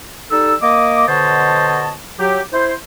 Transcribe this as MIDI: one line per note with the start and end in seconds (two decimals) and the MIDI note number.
0.31 0.55 55
0.31 0.55 63
0.31 0.55 69
0.31 0.55 88
0.61 1.08 58
0.61 1.08 75
0.61 1.08 86
1.08 1.93 47
1.08 1.93 50
1.08 1.93 72
1.08 1.93 73
1.08 1.93 75
1.08 1.93 81
2.19 2.41 54
2.19 2.41 67
2.53 2.74 64
2.53 2.74 72